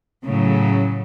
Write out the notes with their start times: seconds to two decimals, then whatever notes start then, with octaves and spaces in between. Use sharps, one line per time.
0.24 A2 C#3 F#3